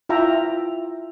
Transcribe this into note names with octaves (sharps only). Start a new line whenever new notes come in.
E4 F4 E5 G5 A#5